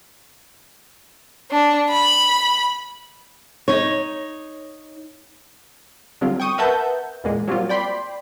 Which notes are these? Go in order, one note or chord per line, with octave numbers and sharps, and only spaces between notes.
D4
B5
D#4 C#5
D3 F#3 G3 C4 F4
G5 C#6 D#6 D#7
A#4 B4 E5 F#5 A5 G6
E2 A#2 G#3
F#3 G3 A#3 C4 F4
D5 G5 B5 C6